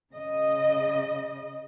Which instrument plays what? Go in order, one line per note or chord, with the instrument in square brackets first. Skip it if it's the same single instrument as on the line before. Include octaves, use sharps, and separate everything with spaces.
[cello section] C#3 D#5